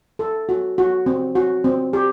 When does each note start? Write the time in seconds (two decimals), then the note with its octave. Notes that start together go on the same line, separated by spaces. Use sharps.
0.19 A4
0.49 F#4
0.78 F#4
1.06 C4
1.35 F#4
1.64 C4
1.93 G4